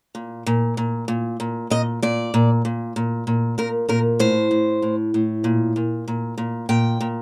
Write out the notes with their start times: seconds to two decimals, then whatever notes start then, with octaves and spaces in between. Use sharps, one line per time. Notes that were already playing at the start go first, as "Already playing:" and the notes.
0.15 A#2
0.46 A#2
0.77 A#2
1.08 A#2
1.40 A#2
1.70 A#2 D#5
2.02 A#2 D5
2.34 A#2
2.65 A#2
2.96 A#2
3.27 A#2
3.58 A#2 A#4
3.89 A#2 A#4
4.19 A2 C5
4.51 A2
4.82 A2
5.14 A2
5.44 A#2
5.76 A#2
6.08 A#2
6.38 A#2
6.69 A#2 G5
7.01 A#2